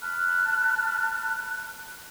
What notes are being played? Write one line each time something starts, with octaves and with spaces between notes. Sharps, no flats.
A5 B5 F6 F#6